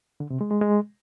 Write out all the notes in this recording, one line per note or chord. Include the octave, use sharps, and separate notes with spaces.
D3
C3
G#3
G#3
G#3